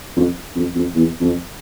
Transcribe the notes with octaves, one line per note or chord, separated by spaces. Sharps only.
F2
F2
F2
E2
F2